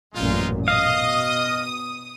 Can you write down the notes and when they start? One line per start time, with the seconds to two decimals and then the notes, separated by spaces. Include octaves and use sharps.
0.14 A1 F#2 A#2 G#3 D#4 F4
0.68 B2 D#5 F5 D#6